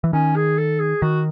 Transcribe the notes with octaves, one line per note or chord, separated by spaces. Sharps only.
E3
D#3 C#4
G#4
A4
G#4
D#3 F#4